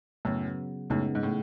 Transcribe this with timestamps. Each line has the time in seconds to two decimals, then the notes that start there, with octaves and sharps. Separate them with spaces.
0.25 F#2 A2 C#3 F#3 B3
0.90 F#2 A2 C#3 G#3 B3 D#4
1.15 G#2
1.23 A2